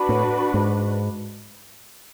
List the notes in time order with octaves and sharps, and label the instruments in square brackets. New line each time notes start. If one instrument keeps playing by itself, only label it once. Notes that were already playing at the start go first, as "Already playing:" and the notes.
Already playing: [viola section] D4 F#4 B4
[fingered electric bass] A2
G#2